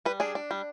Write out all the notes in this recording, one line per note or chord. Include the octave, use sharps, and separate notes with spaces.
G3 B4
D4 G#4
D4
G3